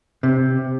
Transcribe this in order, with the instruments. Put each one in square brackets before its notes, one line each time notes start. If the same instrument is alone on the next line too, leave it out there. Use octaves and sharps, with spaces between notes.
[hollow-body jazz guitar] C3